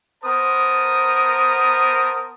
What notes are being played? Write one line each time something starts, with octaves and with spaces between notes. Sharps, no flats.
B3 A#4 C5 A5 A#5 D#6